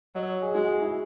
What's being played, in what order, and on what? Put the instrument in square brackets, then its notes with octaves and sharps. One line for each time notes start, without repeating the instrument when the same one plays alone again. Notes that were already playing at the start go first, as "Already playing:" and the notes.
[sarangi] F#3 [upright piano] D#5
[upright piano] G#4
[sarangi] G#3 [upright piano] F#4
[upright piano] G#4
E4